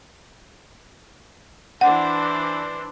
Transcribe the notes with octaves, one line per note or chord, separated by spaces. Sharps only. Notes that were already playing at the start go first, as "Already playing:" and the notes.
E3 D4 C5 F#5